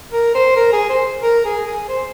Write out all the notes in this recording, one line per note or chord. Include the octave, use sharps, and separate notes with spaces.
A#4
C5
A#4
G#4
C5
A#4
G#4
G#4
C5